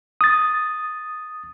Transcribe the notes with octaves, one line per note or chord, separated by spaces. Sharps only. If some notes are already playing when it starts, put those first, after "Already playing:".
D#6 A6